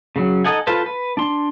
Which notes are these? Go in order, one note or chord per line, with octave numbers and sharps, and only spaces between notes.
C#3 F#3
D#4 A4 D#5 F#5 G#5
F4 A4 B4 C5
B4
D4 C6